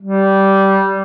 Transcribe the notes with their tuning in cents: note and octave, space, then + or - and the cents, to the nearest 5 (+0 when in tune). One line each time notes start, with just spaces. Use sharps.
G3 -15